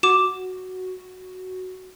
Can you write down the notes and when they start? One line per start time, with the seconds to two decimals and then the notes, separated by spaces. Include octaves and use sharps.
0.03 F#4 D6 E7